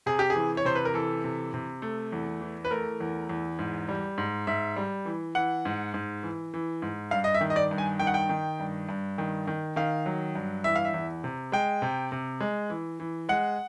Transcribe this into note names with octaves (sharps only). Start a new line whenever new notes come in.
C3 G#4
G4
G#4
E3
C#5
C3 C5
B4
A#4
E3 A4
C3
C3
A3
E2
E3
B4
A3 A#4
E2
E2
G#2
G3
G#2
G#2 E5
G3
E3
E3 F#5
G#2
G#2
E3
E3
G#2
G2 F5
D#5
E5
D#3
D#5
D5
G2
G#5
D#3 G5
F#5
G5
D#3
G2
G2
D#3
D#3
D#3 F5
F#3
G2
E3 E5
F5
E5
E2
C3
G#3 G5
C3
C3
G#3
E3
E3
G#3 F#5